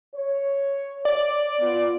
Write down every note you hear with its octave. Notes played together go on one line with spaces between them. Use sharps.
C#5
D5
B3 F4